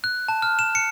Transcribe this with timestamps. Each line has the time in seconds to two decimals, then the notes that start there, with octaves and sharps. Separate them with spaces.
0.04 F#6
0.28 A5
0.42 F6
0.59 E7
0.75 C#7